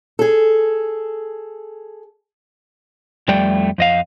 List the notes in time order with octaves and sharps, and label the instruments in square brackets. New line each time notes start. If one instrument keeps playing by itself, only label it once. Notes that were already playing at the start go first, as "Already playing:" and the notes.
[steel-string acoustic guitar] G#4 A4
[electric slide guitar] F2 G3 A3 D5 G5
F2 D#5 F5